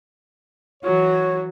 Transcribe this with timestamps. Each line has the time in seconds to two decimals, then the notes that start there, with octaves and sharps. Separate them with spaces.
0.83 E3 F#3 F#4 C#5